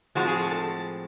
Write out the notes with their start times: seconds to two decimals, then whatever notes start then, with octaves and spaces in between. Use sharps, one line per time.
0.15 A2 F3 G#3 C4 F#4
0.27 G#4
0.40 A4
0.51 A4